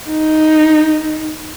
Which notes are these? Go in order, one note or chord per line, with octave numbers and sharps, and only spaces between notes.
D#4